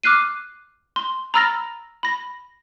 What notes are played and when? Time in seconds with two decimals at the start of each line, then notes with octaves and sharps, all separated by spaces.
0.04 D6 F6 F#6 C7 D#7
0.96 C6
1.34 A#5 B5 E6 F6 A6 A#6
2.03 B5 A#6